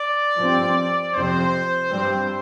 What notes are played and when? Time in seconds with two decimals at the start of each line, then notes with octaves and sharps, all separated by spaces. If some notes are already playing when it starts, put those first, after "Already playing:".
Already playing: D5
0.37 G2 F3 C4
1.13 F2 C3 F3 C4 C5
1.90 G2 G3 C4